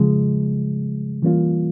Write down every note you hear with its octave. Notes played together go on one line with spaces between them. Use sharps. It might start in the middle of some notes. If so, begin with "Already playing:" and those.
Already playing: C#3 F3 G#3
E3 G3 A#3 C#4 F4